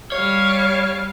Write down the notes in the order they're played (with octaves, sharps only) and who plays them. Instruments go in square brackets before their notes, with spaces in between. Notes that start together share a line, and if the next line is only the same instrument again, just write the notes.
[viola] G3 F5 [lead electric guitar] C#5